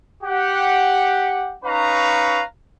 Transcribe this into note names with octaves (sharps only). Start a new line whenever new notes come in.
G4 F#5
C#4 D#4 B4 F5 A#5 C#6